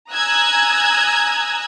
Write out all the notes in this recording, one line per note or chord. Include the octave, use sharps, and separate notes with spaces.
G#5 A#5 D#6 E6 F#6 G#6